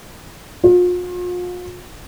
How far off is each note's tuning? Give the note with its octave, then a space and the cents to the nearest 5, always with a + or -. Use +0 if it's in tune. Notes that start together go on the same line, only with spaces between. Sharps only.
F4 +40